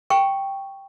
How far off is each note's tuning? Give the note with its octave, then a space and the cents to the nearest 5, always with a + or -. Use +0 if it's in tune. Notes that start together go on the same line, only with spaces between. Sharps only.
G5 +0 C#6 +0